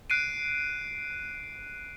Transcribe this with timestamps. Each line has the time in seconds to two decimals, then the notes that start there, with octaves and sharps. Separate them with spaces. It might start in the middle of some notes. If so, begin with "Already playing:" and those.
0.10 F#6 C7 D7 D#7